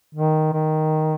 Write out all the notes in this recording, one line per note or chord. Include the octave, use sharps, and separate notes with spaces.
D#3
D#3